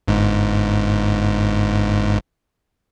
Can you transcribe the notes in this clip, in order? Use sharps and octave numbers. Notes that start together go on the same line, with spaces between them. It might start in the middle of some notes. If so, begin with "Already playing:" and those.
G1 G#2